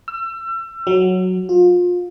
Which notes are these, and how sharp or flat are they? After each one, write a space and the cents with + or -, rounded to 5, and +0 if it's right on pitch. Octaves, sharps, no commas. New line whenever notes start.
E6 +35
F#3 +0
F4 +30